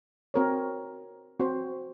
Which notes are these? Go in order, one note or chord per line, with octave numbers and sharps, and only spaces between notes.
C4 F#4 A#4 C#5
C4 F#4 C5